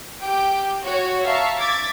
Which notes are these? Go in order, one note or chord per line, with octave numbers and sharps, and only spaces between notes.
G4 G5 D6
F#4 C#5
E5 F5 A5 A#5 C#6
D6 G#6 A6 B6